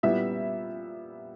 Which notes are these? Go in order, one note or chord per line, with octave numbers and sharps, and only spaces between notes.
A#2 G3 B3 E4 E5